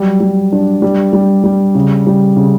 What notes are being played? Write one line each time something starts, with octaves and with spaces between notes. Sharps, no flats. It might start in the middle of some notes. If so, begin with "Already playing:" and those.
Already playing: F#3 G3
G3
D4
G3
G3
G3
C#3
G3
C#3